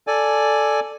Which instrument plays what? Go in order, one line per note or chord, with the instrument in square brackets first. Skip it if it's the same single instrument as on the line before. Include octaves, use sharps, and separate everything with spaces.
[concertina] A4 D5 G#5